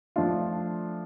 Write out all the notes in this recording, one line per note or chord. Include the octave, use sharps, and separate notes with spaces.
F3 A3 D4 F4